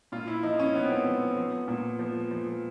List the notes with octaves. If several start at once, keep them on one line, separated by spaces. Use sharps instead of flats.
A#2 F4
E4
F3 D#4
C#4
F3 B3
C4
B3
F3
F3
A#2
F3
F3